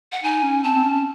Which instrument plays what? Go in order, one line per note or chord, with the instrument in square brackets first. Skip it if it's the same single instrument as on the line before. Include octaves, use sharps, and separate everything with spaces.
[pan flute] F#5
[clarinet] D#4 [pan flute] G#5
[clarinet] C#4
[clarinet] C4 [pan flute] A5
[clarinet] C4
C#4